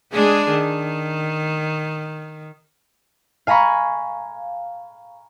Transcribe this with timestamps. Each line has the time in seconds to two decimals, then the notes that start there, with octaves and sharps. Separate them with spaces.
0.13 G#3 D4 G#4
0.50 D#3
3.47 F5 G#5 A#5 B5 C#6